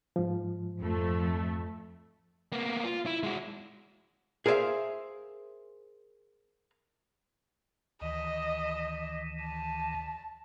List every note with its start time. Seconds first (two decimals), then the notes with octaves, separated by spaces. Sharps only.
0.16 G#2 F3
0.79 F2 A3
2.52 A#3 B3
2.85 F4
3.06 E4
3.23 G#3 F#4
4.46 G#4 A#4 C5 D5 E5 F5
8.01 D2 D#3 E3 D#5
9.42 A5